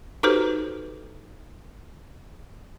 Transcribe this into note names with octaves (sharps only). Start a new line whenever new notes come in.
D#4 F#4 G4 A4 B4 C5